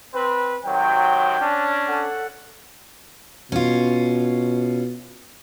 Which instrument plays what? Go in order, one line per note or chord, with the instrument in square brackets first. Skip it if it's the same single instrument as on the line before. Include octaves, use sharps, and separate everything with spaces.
[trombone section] C4 B4
[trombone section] C3 D#3 F#3 [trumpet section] G5
[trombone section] C#4 D4
[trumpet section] A4 F#5
[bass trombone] B2 [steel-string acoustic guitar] C#4 F4